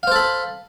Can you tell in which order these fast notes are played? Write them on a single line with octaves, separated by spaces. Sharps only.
F5 C5 A4 B5